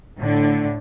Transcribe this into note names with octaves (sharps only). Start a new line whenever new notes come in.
A2 D3